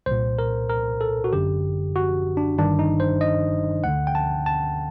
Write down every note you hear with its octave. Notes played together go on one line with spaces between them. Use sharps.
C2 A#2 C5
A#4
A#4
A4
F#4
G1 F#2 D3 G4
F#4
D4
G1 G2 D#3 D4
D#4
C5
D#5
D2 D3 F#5
G5
A5
A5